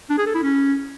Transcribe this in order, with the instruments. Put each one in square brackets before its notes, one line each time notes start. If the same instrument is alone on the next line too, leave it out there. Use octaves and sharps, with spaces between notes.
[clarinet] D4
G#4
A4
E4
C#4